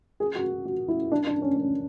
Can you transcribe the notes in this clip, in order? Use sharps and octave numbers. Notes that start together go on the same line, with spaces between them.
G#4
F#4
F#4
E4
D4
D4
C#4
C#4